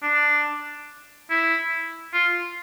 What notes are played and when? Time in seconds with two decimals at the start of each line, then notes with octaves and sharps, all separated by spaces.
0.03 D4
1.30 E4
2.14 F4